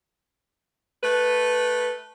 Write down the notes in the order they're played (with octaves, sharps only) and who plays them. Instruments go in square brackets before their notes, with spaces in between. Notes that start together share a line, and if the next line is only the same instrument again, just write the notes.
[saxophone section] A3 B4